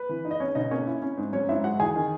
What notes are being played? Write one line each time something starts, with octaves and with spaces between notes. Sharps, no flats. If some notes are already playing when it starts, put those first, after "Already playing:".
Already playing: B4
E3
D#4
D#5
C#4 C#5
B2 D#4 D#5
A#3 C#4 C#5
E4
C#4
G#2
F#3 C#4 C#5
G#2 E4 E5
G#3 F#4 F#5
E2 G#4 G#5
D#3